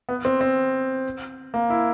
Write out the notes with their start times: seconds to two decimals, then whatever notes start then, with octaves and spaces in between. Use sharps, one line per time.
0.09 B3
0.25 C4
0.41 C4
1.54 A#3
1.70 E4